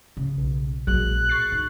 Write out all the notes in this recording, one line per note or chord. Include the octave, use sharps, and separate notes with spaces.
C#3
B1
A#1 F#3 G#3 F#6
C#6 A6 C7
D#4